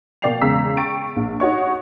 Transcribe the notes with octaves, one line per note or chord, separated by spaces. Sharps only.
B2 A#3 D5 G5 C7 F7
E2 C#3 G#3 A#5 E6 B6
G5 C#6 A6 D7
A#1
D#4 F#4 C#5 C#6